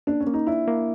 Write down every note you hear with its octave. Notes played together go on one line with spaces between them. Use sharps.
A#3 D4
C#4
A#3
D#4
D4 E4
A#3